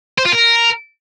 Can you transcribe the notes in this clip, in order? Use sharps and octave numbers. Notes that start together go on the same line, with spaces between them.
C5
F4
A#4